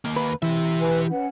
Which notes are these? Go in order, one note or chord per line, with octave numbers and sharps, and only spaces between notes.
D#2 A#3
B4
E3 G4 E5
B4 G#5
C#4 B4 F#5